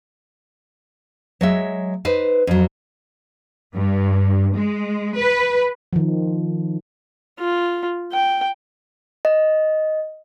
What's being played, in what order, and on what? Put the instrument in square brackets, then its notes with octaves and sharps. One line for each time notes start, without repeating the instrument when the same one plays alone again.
[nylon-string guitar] F#3 G#3 E5
D#4 B4 C5
F2 F#3
[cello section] G2
G#3
B4
[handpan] D#3 F3
[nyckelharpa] F4
G5
[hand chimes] D#5